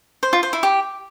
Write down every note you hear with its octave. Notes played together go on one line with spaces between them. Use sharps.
C5
F4
C5
E4
G4